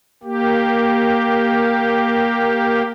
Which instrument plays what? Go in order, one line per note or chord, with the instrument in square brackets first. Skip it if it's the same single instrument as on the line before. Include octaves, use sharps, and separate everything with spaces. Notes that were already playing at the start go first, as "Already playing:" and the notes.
[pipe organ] A#3 G4